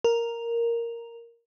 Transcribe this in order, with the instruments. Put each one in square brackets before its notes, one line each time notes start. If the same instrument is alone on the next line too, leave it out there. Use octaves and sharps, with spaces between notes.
[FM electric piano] A#4